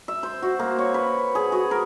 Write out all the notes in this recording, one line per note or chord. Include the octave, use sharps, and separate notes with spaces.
E5
C5
F#4
A#3
C#5
B4
G#4
F#4
A#4